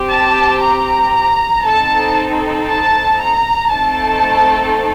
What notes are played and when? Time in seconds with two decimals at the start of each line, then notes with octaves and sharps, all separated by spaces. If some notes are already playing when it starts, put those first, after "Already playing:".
Already playing: C4 G4
0.09 A5
0.61 A#5
1.64 C4 D#4 A4 A5
2.68 A5
3.19 A#5
3.70 A3 C4 D#4 A4 A5